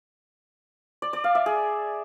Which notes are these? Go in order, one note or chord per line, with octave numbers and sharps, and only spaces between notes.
D5
D5
F5
E5
G#4